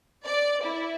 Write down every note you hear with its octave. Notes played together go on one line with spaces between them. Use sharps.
D5
E4